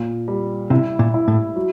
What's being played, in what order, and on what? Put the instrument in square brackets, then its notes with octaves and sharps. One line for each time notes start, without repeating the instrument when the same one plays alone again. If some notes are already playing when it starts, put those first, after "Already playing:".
Already playing: [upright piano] A#2
G3
[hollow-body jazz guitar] C3 [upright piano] E4
[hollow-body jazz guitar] A#2
[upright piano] E4
[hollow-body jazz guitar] A2
[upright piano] F#3